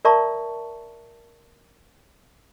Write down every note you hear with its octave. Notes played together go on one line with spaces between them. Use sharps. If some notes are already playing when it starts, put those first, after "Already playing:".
A#4 D5 E5 A5 A#5 C#6